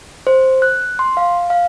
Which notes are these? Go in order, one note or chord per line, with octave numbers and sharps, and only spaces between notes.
C5
F#6
C6
F5
F5